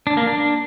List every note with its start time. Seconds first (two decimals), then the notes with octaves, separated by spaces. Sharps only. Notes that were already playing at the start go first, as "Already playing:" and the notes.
0.07 D4
0.17 A#3
0.28 D4